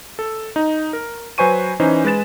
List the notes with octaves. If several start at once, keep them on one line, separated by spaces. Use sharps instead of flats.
A4
D#4
A#4
F#3 B4 C5 G#5 C#6 D#7
E3 C#4 D#4 C5
G#3 B4 A6 E7